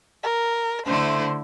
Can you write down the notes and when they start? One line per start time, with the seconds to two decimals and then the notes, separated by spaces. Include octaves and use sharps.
0.23 A#4
0.86 D3 A3 E4 C5